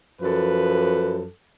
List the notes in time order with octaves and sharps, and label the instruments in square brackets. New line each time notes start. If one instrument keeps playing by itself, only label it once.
[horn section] F#2 F3 A4 B4